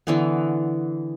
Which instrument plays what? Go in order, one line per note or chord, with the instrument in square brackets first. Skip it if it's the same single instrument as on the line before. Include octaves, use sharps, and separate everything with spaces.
[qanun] D3 E3 B3